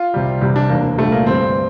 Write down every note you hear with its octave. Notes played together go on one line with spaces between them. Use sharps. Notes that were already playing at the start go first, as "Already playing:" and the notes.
Already playing: F4
C2 C3 G3
C2 C3 E3 G3
D4
E1 D2 D3 A#3
C2 A#2 G3 A3
A#3
G1 G2 E3 G3 C4